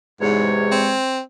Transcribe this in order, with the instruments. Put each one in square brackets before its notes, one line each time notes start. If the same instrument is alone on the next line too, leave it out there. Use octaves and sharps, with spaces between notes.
[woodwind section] E2 C3 C#5 [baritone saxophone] G#2 [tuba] G#3
[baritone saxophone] C4